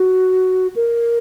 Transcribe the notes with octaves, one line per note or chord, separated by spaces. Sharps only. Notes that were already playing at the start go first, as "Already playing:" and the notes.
Already playing: F#4
A#4